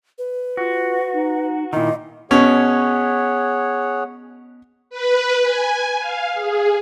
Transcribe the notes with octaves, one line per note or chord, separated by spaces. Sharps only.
B4
F4 F#4
D#4
A#2 D#3 E4 D#5
B2 C#4 G#4 C#5 F#5
B4
G#5
F5
G#4